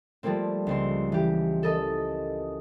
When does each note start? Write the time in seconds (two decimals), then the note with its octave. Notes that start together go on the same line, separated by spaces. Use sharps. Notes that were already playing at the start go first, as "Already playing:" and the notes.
0.23 F3 G3 A3 A#3 C4
0.67 C#2 C4 C6
1.12 E3 G4
1.63 A4 A#4 D#5